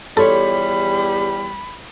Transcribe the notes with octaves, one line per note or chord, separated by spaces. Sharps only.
E2 G3 F4 G4 A4 C#5 B5